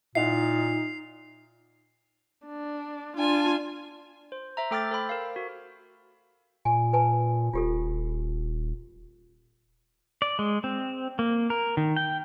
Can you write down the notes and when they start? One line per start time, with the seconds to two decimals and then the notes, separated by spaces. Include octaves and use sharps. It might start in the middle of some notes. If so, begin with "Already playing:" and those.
0.15 A#2 D#4 E4 D#5 F#5 C7 F7
2.46 D4
3.17 D4 F4 G#5 A5
4.32 C5
4.57 C5 E5 A#5
4.71 A3 A4 G5 D6 F6 A6
4.91 A4 C5 B5
5.09 A#4 F5
5.36 F#4
6.65 A#2 G#5
6.93 B4 G#5 A5
7.53 D#1 F4 G4 A4
10.22 D5
10.39 G#3
10.64 C4
11.19 A#3
11.50 A#4
11.77 D#3
11.96 G5